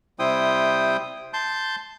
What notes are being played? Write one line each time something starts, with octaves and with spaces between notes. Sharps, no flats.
C3 G3 E4 C5 G5 D#6
A5 C6 G6